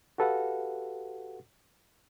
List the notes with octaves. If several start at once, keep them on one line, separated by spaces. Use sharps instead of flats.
F#4 G4 A4 B4 F5 F#5